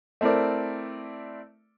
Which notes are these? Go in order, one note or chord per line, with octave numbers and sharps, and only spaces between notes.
A3 C4 E4 A#4 D5